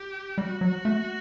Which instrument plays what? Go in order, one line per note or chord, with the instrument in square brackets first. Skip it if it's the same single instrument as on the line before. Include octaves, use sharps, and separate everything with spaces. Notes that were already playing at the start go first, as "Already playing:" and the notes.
Already playing: [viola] G4
[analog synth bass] G3 [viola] F#4
[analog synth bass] F#3
A3